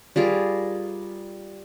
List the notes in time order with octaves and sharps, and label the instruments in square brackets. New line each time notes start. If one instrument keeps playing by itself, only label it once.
[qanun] G3 F4 G#4 A#4